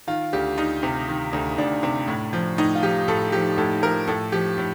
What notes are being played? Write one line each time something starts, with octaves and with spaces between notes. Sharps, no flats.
D#3 F4
D2 G4
D2 D#4
C3
D#3
D2
D2 D4
C3
A2
F3
A2 D#4
F4
F3 G4
A2 A4
F3 G4
A2 A4
F3 A#4
A2 A4
F3 G4
A2